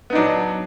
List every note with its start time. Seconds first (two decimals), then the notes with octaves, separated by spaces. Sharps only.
0.10 B3
0.13 D#4
0.15 D4
0.18 F#3